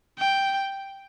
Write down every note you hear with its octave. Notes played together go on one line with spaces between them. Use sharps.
G5